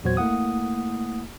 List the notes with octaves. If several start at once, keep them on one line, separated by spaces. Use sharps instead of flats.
E2 A#2 F#3 F#4 C5 G#6
A3 A#3 E4 F#5 D#6